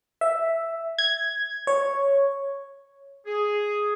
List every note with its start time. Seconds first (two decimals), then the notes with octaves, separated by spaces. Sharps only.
0.21 E5
0.99 G#6
1.67 C#5
3.27 G#4